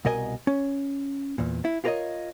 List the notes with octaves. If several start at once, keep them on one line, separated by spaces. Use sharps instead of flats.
C2 B2 A#4 D#5 G#5
C#4
E2 A#2
E4
F4 G4 A#4 B4 C#5 D#5